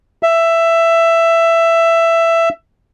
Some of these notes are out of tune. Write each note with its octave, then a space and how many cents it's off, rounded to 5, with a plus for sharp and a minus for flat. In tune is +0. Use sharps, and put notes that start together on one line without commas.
E5 +10